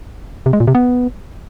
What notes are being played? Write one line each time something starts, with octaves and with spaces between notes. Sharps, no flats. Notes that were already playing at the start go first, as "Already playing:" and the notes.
C3
G#3
A#2
C3
B3